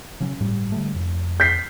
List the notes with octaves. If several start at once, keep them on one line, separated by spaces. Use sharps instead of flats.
C#3 F#3 C#4
G1 A2 G3
D3 G3 A3
F1
G6 B6 C7